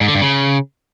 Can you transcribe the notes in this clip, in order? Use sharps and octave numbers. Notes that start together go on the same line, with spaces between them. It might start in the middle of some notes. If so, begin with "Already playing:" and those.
G#2
D3
G2
C#3